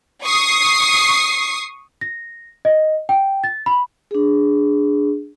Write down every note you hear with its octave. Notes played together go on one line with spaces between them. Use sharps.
C#6 D#6 C7
A#6
D#5
G5
A6
B5
D4 G#4